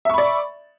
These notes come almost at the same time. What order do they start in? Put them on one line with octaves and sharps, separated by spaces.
E5 C#6 B5 D5